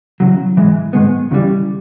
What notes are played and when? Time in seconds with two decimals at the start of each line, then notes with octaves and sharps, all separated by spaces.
0.20 E2 C#3 F#3
0.57 G#2 E3 G#3
0.93 G#2 D#3 G#3 B3
1.31 D#2 C#3 E3 G3